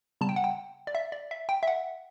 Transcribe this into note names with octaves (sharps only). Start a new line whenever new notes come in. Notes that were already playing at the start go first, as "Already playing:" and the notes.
C#3 G3 B3 A5
G5
F#5
G5
D5
E5
D5
E5
G5
E5
F#5